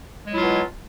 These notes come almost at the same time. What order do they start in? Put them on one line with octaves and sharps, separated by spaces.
G#3 F#3 E4 F4 B2